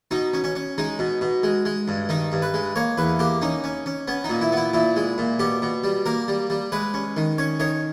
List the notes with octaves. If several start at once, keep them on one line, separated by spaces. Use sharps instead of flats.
B2 D#4
C#4
C#4
C#4
G#3 D#4
B2
B2
G#3
G#3
G2
D#3 D#4
G2
B4
G#3
A#3 C#5
E2 B4
A#3 G4
C#4 D#4
C#4
C#4
B3 C#4
D#4
A#2
E4
B3 E4
A#2 E4
G#3
A#2
B2 G4
B2
G3
A#3 A#4
G3
G3
G#3 B4
C#4
D#3
C#4 C#5
D#3 C#5